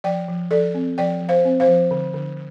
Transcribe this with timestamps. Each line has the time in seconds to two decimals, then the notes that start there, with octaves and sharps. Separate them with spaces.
0.04 F3 D5 G5
0.28 F3
0.51 F3 A4 D5
0.74 C4
0.98 F3 D5 G5
1.22 F3
1.29 C5 F5
1.45 C4
1.60 C5 F5
1.68 F3
1.91 D3
2.14 D3